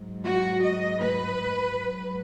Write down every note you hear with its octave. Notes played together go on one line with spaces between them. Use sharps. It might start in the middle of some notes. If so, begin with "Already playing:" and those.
Already playing: G#2 F#3
F#4
D#5
B4
G#2 F#3